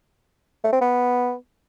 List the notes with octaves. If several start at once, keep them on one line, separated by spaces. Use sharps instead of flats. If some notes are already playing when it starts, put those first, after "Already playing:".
A3
C4
B3